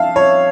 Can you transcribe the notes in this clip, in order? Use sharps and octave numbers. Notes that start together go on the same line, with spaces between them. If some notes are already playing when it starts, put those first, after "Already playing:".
Already playing: F3 C#4 E5 F5 A5
C#5